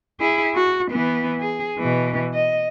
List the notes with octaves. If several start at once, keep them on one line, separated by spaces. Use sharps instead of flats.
E4 G#4
F#4
E3 B3
G#4
B2 E3
D#5